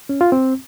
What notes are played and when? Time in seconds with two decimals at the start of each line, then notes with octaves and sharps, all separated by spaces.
0.09 C#4
0.21 F4
0.32 C4